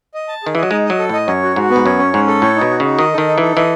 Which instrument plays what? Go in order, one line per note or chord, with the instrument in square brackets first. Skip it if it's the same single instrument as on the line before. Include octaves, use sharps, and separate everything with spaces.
[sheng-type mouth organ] D#5
A5
[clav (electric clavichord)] D#3 [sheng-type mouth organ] G#4
[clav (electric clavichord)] E3 [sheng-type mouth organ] D#5
[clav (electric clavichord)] F#3
[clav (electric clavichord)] G#3 [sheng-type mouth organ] D#4
[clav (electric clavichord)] F#3 [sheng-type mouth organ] D#5
[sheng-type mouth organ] A4
[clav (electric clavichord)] A2 [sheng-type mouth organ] D#5
[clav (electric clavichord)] F#2 [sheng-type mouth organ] C#5
[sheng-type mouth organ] F#4
[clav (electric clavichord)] G#2 [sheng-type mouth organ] F#4
[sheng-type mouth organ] B3
[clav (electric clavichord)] G#2
[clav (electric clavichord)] F#2 [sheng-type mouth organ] C#5
[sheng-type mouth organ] C#4
[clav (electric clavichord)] G#2 [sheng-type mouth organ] C#4
[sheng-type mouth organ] A4
[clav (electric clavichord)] A2 [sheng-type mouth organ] C#5
[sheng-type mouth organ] D#4
[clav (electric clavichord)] B2
[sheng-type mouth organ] F#4
[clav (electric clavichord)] C#3 [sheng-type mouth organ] D#4
[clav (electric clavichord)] D#3 [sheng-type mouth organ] D#5
[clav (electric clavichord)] D#3 [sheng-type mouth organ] A4
[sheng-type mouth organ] D#4
[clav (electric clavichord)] E3 [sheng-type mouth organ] A4
[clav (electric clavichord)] E3 [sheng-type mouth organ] D#5